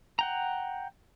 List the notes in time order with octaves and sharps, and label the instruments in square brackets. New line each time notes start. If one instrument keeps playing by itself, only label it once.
[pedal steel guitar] F#5 G5 A#5